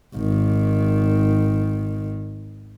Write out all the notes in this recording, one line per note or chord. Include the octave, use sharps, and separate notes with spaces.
G#1 D#3